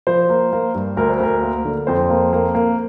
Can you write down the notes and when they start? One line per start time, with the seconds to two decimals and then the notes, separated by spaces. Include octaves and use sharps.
0.07 F3 C5
0.30 A#3
0.53 A#3
0.75 G2
0.97 D2 A#4
1.10 C5
1.20 D2 A#4
1.43 A#3
1.65 D3
1.87 F2 C5
2.10 A#3
2.33 A#3
2.55 A#3